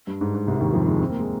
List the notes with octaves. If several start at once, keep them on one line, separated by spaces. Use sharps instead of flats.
G2
G#2
G#2
C2 C3
D#2 D#3
F2 F3
G#2 G#3
C4
A#3
G#3